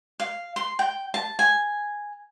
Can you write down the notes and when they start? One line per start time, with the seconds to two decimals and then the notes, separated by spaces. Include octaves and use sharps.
0.20 F5
0.56 C6
0.79 G5
1.14 A5
1.39 G#5